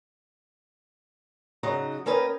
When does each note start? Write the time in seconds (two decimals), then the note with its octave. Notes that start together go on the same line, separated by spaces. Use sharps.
1.63 C#3 F#3 D#4 D#5 F#5 A#5
2.06 A#3 C#4 A#4 B4 D#5 G5